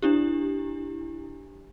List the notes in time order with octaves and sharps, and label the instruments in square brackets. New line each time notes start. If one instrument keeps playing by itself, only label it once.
[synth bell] D4 E4 G4